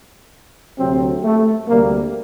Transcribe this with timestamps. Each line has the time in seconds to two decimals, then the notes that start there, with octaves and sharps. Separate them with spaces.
0.78 D2 C3 F#3 C4
1.23 A3
1.68 D2 C3 G3 A#3